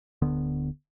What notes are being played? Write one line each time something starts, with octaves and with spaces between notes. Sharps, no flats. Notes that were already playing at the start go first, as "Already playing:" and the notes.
D1 D3 B3